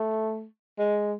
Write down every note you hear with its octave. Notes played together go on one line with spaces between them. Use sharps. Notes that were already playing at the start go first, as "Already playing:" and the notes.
Already playing: A3
G#3